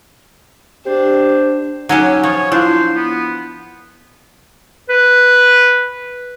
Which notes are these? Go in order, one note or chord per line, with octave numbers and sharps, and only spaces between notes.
D4 G4 C5
F#3 C#4 D#4 G4
F3 C#5 D#6
D4 E4 F4 C5 F5
B3
B4